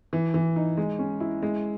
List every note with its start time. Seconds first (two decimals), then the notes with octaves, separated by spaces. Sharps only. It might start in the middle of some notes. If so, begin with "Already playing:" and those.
0.13 E3
0.34 E3
0.56 D#4
0.77 G#3
0.99 C#4
1.20 E4
1.42 G#3